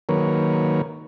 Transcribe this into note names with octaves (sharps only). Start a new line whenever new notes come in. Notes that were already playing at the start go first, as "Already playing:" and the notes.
D#3 F#3 A#3 A#4 B4 C#5